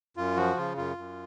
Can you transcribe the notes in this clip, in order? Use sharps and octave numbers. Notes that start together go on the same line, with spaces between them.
F#2 F4
F3 F#4
C#3 F4
F#2 F4
F#2